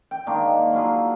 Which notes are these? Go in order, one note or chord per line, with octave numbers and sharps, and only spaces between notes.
G5
D#3 G#3 A#3 D4
F#3 E4 F4 G#4